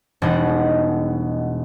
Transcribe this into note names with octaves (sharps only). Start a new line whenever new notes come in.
E1 B2 G3 G#3 D#4 F#5